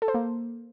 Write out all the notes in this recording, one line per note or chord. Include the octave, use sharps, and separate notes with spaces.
A4
C5
A#3